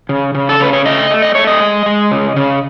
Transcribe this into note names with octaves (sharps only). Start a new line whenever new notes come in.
C#3
C#3
A4
C#3 B4
C#5
A3 D#5
A3
D#5
A3 C#5
D#5
G#3
G#3
C#3
C#3